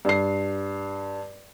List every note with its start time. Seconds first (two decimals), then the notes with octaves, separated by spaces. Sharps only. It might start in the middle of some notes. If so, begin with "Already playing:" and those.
0.05 G2 C7